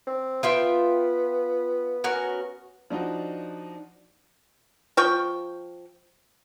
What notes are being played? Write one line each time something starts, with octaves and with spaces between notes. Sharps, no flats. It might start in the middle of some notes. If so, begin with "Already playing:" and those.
C4
B3 F4 E5 G5
C#4 F#4 A#4
F3 D4 D#4 F#4
F3 G5 C#6